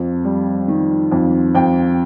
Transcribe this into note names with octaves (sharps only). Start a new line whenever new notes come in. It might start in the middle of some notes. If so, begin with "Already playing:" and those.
Already playing: F2
G3
D#3
F2
F2 G5